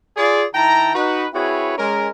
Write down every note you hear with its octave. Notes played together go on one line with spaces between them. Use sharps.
F4 G#4 D5
D#3 E4 G5 A5 A#5
D#4 F#4 B4
C4 E4 F#4 G#4 B4 C#5
G#3 C#4 A#4